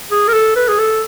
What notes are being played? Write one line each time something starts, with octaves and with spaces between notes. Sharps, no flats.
G#4
A#4
A4
B4
G#4
A4